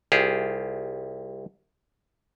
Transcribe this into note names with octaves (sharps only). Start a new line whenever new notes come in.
C2 F4 G4 G#4